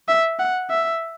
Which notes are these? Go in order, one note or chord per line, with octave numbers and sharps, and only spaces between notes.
E5
F#5
E5